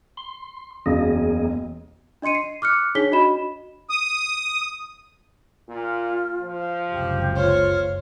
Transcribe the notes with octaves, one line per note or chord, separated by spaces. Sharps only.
C6
E1 F#2 A#3 G#4 D#5
D4 D#5 C6 C#7 D#7
C7
D6 F6 F#6 C#7
D4 D#4 G#4 C#5 B6 G7
D4 F#4 D#5 B5 E7
D#6
A#2 F4
F3
F#1 C#2 C3 G4
F4 C5 C#5